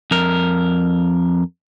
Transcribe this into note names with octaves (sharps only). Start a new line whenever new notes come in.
F2 A#4